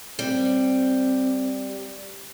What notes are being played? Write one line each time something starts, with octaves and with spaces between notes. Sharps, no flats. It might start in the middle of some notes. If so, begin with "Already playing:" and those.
G3 C4